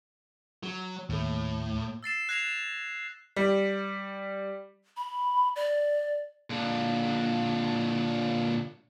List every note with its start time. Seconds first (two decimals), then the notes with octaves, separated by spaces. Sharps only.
0.63 F#3
1.09 D#2 A2 A3
2.03 E6 A6 C7 E7
2.29 F#6 G#6 A#6 C7 E7 F7
2.47 E7
3.36 G3
4.97 B5
5.56 D5
6.50 A#2 D3